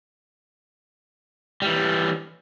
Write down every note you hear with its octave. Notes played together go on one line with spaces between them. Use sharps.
E3 G3